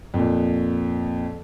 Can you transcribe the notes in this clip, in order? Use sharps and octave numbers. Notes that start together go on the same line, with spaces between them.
F2 A#2